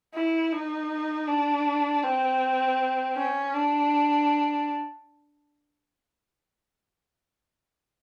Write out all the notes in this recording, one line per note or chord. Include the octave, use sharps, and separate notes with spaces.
E4
D#4
D4
C4
C#4
D4